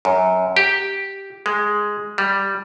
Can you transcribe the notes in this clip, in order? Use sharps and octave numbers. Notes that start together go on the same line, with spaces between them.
F#2
G4
G#3
G3